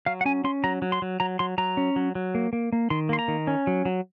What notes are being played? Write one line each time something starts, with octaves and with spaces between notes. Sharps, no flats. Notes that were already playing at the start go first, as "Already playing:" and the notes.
F#3 F5
F#5
C#4 G#5
C#4 C6
F#3 A#5
F#3
C6
F#3
F#3 A#5
F#3 C6
F#3 A#5
C#4
F#3
F#3
A#3
A#3
A#3
D#3 C6
A#3 C6
A#5
D#3
C#4
F#3
F#3